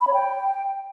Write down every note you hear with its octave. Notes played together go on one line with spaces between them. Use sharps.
B5
C#5
G5